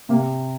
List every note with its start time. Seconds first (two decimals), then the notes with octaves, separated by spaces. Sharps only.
0.09 C3 A#3